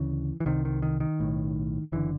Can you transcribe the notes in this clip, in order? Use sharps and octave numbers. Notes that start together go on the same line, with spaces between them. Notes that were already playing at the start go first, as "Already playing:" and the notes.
Already playing: D2 C#3 E3
E3
C2 C3 D#3
D#3
D#3
D#3
B1 A2
F#1 D3 E3